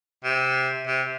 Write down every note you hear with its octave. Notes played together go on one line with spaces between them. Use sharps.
C3
C3